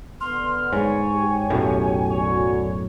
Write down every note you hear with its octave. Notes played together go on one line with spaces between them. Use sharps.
D3 B3 C6 F6
G#2 C#5 G#5
G4
B1 F#2 A2
D3 F#3 C#5